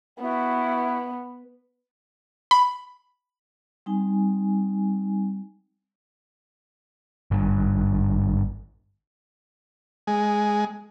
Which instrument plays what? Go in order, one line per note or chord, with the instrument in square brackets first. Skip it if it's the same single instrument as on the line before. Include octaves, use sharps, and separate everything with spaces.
[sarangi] B3 [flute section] E4 F#4
[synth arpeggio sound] B5
[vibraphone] G3 C4 D#4 G#5
[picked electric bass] G#1 G2
[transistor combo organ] G#3